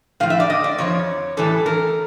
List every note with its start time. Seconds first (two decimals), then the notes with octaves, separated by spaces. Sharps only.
0.20 A2 F3 F5
0.30 E5
0.40 D5
0.50 D#5
0.64 D5
0.78 F2 C#3 F3 C#5
1.37 A2 E3 G3 A4
1.66 A#4